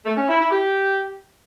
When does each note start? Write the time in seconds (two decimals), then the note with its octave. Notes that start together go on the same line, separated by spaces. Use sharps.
0.05 A3
0.17 C#4
0.28 E4
0.40 E4
0.51 G4